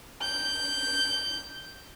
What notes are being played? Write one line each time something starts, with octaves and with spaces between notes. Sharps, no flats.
G6